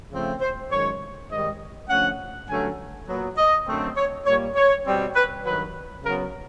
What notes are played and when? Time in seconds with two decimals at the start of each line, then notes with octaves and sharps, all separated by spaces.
0.11 C#3 F3 A3 C4
0.41 C5
0.71 F#2 D#3 G#3 C#5
1.30 G#2 D#3 G3 D#5
1.89 D3 F3 A3 C#4 F#5
2.48 G2 D3 F#3 A3 C#4 G#5
3.07 A#2 F#3 B3
3.37 D#5
3.67 F#2 D3 F#3 A3 C4
3.96 C#5
4.25 A#2 G3 A#3 C#5
4.56 C#5
4.85 B2 G3 C4
5.15 B4
5.44 G2 D#3 F#3 B4
6.03 C#3 F#3 B3 A#4